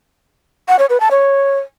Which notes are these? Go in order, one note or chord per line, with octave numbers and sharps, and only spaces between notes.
F#5
C#5
B4
A5
C#5